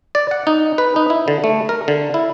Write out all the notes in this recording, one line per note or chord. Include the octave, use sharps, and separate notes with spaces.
D5
F#5
D#4
B4
D#4
E4
D3
A3
A#4
D3
E4